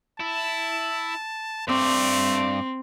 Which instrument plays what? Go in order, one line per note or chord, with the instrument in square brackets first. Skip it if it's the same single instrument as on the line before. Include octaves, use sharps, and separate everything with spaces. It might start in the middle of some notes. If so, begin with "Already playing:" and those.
[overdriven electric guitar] E4 [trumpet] A5
[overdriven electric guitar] G2 D5 [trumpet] A3 [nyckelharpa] C4